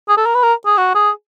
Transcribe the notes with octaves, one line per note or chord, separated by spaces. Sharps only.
G#4
A4
A#4
B4
A#4
G#4
F#4
G#4